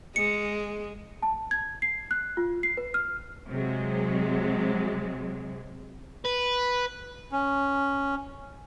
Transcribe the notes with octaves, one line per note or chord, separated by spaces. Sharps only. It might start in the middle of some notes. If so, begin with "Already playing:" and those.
G#3 C#7
A5
G#6
C7
F#6
F4
C7
B4
F6
C3 F#3 G#3
B4
C#4